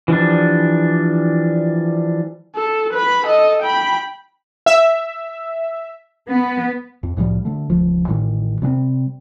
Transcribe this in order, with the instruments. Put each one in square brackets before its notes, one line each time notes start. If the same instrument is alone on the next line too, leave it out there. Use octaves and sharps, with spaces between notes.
[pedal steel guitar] E3 F3 G3 D4
[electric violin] A4
B4 B5
A4 D#5
G5 B5
[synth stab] E5
[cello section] B3
[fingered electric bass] F2
C2 A2 F3 G3
D3 A3
D#1 C#2 F3
A1 A2 D#3 G3
C3 G3 A3 C4